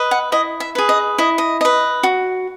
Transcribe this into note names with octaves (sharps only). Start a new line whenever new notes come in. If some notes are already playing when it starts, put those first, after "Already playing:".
Already playing: B4 D#5
F#5
E4 D#5
E5
G#4 B4
D#5
E4 D#5
D#5
B4 D#5
F#4